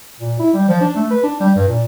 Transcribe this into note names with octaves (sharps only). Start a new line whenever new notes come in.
A#2
E4
G3
F3
D4
A3
B4
D4
G3
G2
A#2